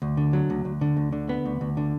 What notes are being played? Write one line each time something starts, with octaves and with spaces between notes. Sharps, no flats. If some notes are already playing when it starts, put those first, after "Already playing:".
D2
D3
F#3
D2
D2
D3
D2
D3
B3
D2
D2
D3